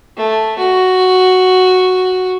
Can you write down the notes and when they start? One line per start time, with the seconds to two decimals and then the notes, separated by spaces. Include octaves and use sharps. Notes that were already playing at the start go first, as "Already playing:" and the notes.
0.17 A3
0.58 F#4